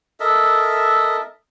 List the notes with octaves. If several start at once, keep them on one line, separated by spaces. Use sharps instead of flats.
A4 A#4 D#5 E5